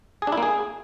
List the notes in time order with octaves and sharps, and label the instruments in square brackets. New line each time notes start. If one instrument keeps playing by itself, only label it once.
[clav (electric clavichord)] G#4
D4
E4
A#3
G#4